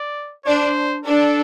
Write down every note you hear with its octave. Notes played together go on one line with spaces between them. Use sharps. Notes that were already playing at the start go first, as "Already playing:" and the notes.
Already playing: D5
D4 C5
D4 A4